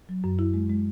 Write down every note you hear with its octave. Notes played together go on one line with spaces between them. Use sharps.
F#3
F#2
E4
G#3
G#3